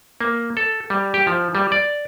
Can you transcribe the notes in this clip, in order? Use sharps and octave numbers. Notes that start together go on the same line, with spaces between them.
A#3
A4
G3
G4
F3
G3
D5